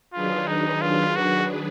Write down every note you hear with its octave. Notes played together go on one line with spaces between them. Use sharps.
D#3 F#3 D4 F4 G#4 B4
D#4
F4
F#4